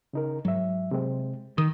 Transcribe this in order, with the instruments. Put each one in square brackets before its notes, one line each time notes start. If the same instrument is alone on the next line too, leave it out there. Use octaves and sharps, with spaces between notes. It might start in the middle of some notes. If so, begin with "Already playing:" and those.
[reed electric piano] C#3 D#4 A#4
[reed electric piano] G#2 E5 [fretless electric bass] F#3
[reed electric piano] C3 G#3 C4
[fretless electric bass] D#3 [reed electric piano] D#6